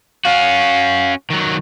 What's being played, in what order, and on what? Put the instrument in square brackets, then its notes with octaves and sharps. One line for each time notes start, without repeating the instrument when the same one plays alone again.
[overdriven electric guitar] C#4 F#4 [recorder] F5
[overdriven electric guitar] D#3 F#3